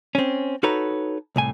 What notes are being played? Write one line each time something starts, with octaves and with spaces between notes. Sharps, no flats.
C4 C#4
D#4 F#4 A4 B4 C#5 A#5
C2 A2 G#5